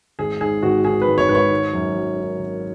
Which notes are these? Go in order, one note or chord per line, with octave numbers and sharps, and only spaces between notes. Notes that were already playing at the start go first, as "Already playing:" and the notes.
G#1 G#4
G#2 G#4
G#1 F#4
D#3 G#4
B4
G#1
C#5
G#2 B4
C#5
G#1
F#2
F#3
D#3
G#1